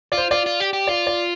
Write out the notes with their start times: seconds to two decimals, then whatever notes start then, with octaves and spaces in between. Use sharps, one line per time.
0.12 F4 D5
0.17 C5
0.31 F4 D5
0.46 F4
0.60 G4
0.73 G4
0.87 F4 D5
1.07 D5